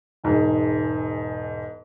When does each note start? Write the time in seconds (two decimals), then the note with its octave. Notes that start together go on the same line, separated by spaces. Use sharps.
0.24 E1 G#2